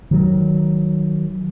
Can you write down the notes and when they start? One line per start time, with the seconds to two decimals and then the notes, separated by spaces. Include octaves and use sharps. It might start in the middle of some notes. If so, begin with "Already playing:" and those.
0.11 D#3 F#3